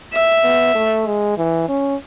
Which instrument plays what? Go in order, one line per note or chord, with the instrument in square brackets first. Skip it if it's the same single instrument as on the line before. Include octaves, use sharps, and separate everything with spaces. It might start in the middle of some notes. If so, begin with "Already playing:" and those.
[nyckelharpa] E5
[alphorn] B3
A3
G#3
E3
C#4